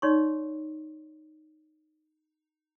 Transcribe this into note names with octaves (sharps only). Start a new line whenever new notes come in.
D#4 C#5 D5 C6 C#6